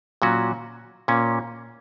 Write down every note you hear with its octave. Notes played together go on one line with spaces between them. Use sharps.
A#2 F#3 C#4 F#4
A#2 A#3 C#4